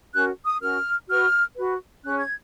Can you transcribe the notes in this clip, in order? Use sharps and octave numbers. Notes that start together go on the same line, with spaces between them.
C#4 F#4 A#4 F#6
D#6
C#4 F#4 A#4 F6
F#4 B4 F6
F#4 B4
C#4 G#4 C#5 F#6
G#6